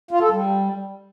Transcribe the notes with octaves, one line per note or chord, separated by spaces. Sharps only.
F4
A4
G3